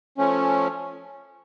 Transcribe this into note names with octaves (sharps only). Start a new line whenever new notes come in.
F3 A3 C#4